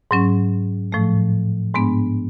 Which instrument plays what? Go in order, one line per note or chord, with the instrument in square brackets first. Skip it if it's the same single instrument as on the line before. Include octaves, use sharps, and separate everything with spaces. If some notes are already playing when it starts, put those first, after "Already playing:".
[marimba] G#2 F#3 C#4
A2 F3 A3
G#2 G#3 B3 D4